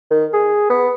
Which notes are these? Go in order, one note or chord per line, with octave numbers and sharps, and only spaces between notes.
D#3
G#4
B3